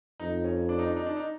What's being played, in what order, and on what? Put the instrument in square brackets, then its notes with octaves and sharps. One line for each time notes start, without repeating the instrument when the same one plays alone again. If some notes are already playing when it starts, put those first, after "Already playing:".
[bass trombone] F2 [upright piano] D#4
[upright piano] C#4
D4
D#4
D4
D#4
D4
D#4